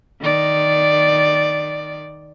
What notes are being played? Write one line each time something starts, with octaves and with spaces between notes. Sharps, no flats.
D#3 D5